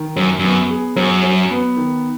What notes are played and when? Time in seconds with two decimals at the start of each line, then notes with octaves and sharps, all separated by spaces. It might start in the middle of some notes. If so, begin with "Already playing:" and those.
Already playing: D#3
0.16 F#2 F#3
0.39 F#2 B3
0.70 G#4
0.96 F#2 F#3
1.23 F#3
1.50 B3
1.77 D#3